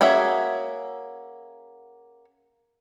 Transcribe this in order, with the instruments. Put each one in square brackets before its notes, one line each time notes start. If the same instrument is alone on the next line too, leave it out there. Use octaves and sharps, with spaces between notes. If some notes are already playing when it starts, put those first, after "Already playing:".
[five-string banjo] A#3 C#4 F#4 G#4 E5